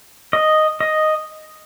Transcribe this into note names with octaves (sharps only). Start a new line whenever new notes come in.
D#5
D#5